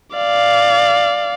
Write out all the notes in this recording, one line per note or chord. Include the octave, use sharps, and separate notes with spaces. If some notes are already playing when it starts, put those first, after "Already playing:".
D5 F5